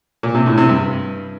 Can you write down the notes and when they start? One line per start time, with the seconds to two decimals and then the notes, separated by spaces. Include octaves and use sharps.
0.23 A#2
0.35 C3
0.46 A2
0.58 C3
0.69 G2